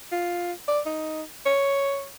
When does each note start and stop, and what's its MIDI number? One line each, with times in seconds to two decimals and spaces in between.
0.12 0.53 65
0.68 0.81 74
0.86 1.23 63
1.46 2.07 73